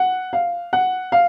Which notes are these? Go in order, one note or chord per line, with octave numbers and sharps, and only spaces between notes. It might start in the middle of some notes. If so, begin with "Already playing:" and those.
Already playing: F#5
F5
F#5
F5